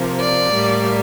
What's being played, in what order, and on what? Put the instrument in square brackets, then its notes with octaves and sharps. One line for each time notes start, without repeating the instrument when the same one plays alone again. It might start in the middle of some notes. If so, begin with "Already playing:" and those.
Already playing: [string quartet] C3 F3 A#3
D5
A2 G3 A#3